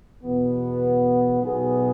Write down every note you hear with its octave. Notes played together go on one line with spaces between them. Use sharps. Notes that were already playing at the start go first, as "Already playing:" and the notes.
E2 B2 B3
B1 B2 B3 G#4